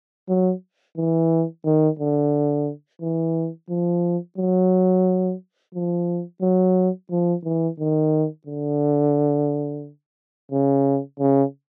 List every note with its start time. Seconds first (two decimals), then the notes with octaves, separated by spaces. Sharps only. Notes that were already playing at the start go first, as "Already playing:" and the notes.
0.29 F#3
0.97 E3
1.65 D#3
1.99 D3
3.01 E3
3.70 F3
4.38 F#3
5.74 F3
6.42 F#3
7.11 F3
7.44 E3
7.79 D#3
8.47 D3
10.52 C#3
11.19 C#3